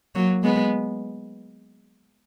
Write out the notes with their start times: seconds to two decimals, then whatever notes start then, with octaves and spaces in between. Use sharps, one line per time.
0.15 F#3 A#3
0.43 G#3 B3